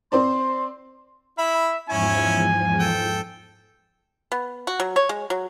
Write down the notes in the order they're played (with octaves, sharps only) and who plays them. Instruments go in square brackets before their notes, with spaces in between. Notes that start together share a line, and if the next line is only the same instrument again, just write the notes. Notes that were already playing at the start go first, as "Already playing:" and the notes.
[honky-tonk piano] C4 C5 D5 [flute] C6
[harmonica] E4 B5 [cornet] E5
[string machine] E2 G#2 F3 [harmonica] C#4 E4 C#5 [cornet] G#5
[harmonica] A4 G5
[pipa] B3
F#4
F#3
C#5
G#3
F#3